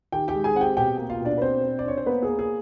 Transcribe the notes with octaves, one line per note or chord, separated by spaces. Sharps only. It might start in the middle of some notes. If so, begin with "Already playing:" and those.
D#3 G4 G5
G4 G5
G#3
G#4 G#5
C4 F#5
G4 G5
B2 G4 G5
A#3
F4 F5
B2 D4 D5
B4
C4 D4 C5
D4
D5
D4 C#5
C5
A#3 B3 B4
G#4
A#3
G#4